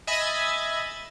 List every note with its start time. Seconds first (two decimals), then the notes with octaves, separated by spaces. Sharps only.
0.07 D#5 E5 G#5 B5 G#6 A6